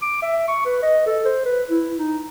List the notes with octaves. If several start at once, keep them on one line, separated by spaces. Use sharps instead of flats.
D6
E5
C#6
B4
D#5
A4
C5
B4
E4
D#4